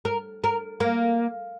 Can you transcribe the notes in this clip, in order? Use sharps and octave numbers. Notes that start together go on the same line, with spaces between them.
A#4
A#4
A#3